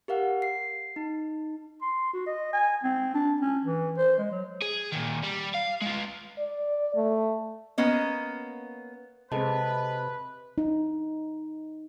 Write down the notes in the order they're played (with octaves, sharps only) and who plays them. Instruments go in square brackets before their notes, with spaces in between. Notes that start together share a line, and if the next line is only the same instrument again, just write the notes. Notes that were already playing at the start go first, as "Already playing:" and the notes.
[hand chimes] G4 A#4 F5 F#5
C7
D#4
[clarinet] C6
F#4
D#5
G#5
C4
D4
C#4
E3
C5
G#3
F#3
[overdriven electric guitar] G#4
A#2 D#3
G3
F5
G#3 F4
[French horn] D5
A3
[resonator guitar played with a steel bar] A#3 B3 C#4 D#5
[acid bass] C3 [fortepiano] G#3 C4 [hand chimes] A4 D#5 A5 [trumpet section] B4
[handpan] D#4